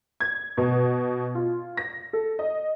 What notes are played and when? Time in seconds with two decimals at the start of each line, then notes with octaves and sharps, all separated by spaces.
0.20 G#6
0.57 B2
1.35 F4
1.77 A#6
2.13 A4
2.39 D#5